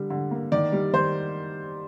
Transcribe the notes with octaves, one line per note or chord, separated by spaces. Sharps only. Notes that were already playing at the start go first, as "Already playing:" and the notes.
Already playing: D3 G3
D3
A#3
D#3 D5
G3
D#3 C5